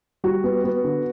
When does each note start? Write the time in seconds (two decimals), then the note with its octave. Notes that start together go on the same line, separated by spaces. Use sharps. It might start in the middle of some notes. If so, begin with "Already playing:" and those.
0.24 G3 F#4
0.44 B3
0.64 B3
0.84 D3